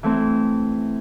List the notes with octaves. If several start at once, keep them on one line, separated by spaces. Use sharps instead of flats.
E3 A3 C4 E4